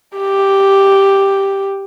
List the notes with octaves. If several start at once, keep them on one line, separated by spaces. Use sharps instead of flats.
G4